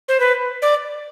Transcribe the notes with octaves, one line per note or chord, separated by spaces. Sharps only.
C5
B4
D5